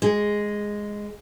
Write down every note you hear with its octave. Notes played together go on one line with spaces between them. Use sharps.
G#3